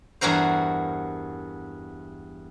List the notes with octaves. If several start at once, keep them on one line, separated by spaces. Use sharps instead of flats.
E2 G2 F#4 A#4 C5